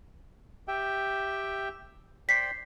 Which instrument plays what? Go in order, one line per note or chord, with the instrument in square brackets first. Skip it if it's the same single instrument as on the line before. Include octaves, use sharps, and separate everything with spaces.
[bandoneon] G4 E5 G5
[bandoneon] C5 D5 G5 [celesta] B6 C7